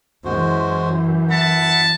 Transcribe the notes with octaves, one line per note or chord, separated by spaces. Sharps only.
F#2 E3 G#3 F#4 C5
E5 F#5 A5 B5